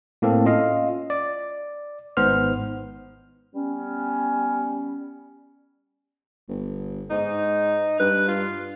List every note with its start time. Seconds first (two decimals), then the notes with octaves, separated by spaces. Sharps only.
0.22 A2 A#3 C4 A4
0.45 C#4 F4 D#5 F5
1.10 D5
2.17 G#1 G#2 B3 C5 C6 F6
3.55 G3 B3 C#4
6.48 G1
7.10 G#2 D#4
7.99 G2 B4
8.28 F4